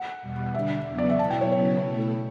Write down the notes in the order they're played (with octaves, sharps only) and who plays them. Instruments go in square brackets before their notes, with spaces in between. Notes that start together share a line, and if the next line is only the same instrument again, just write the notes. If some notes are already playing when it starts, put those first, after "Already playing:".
Already playing: [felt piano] F#5
[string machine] E2 B2 G3
[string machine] D3 G3 D4 [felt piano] E5
[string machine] E2 C#3 F#3 B3
[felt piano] D5
E5
[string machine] B2 F#3 B3 E4 [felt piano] A5
[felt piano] G5
C#5
[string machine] C#3 F#3 B3 E4 [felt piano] C#5
[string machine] B2 A3 E4